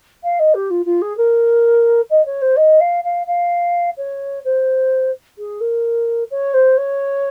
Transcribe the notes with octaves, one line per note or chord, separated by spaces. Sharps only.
F5
D#5
G4
F4
F4
G#4
A#4
D#5
C#5
C5
D#5
F5
F5
F5
C#5
C5
G#4
A#4
C#5
C5
C#5